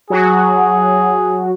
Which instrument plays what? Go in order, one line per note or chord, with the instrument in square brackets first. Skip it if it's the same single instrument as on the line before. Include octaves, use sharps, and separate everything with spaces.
[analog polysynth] F#3 F#4 [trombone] G#4